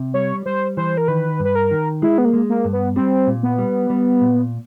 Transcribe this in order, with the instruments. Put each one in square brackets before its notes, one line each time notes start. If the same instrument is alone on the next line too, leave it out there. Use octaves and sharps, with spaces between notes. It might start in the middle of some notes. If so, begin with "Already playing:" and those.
Already playing: [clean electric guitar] C3
[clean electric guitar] G3 [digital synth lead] C#5
[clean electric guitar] G3 [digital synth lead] C5
[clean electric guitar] E3 [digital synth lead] C5
[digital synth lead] A#4
[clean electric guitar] D#3 [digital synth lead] B4
[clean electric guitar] G2
[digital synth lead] B4
A#4
[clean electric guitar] D#3
[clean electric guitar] G#3 [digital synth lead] E4
[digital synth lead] B3
A#3
[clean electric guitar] G#3
[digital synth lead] A#3
[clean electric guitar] G2
[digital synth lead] B3
[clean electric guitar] G3 [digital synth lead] C4
[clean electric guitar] A#2
[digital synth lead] B3
[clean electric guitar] G3
G3
A#2